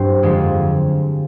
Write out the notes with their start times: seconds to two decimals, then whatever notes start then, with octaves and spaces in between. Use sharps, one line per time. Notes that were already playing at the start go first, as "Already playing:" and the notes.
Already playing: G2 F#3 C4 C5
0.23 F2 D3 F3 G#3